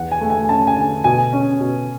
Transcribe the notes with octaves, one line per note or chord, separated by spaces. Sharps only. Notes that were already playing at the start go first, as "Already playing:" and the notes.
Already playing: E2 F#5
G#5
A3
G#5
C#4 A5
G#5
D3
B2 G#5
C#4
B2